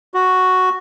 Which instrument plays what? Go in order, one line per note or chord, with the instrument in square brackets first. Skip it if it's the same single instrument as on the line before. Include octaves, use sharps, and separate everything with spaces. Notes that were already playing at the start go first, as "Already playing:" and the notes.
[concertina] F#4